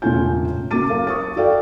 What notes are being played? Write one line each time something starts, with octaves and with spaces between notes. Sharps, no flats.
E1 A2 C#3 F4 G#5 G6
C#2 A#3 F#4 D6 A6 D#7
F#3 A#4 F5
C#6 D#6 A6
F#4 A4 D5 F5 G5